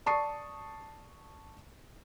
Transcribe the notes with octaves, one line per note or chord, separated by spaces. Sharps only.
D5 A5 C#6 D#6 C7